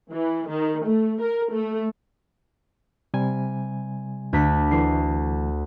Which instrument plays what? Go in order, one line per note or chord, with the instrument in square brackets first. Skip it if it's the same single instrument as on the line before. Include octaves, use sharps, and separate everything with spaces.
[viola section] E3
D#3
A3
A#4
A3
[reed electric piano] C3 G3 G#5
[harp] D2 D4 B6
[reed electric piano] D3 E3 A3 [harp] C7